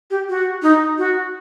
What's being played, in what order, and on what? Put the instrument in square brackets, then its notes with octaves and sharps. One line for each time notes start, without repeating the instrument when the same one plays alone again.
[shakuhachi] G4
F#4
D#4
F#4